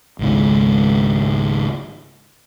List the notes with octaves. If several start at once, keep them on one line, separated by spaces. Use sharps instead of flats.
G#1 C#2 G#2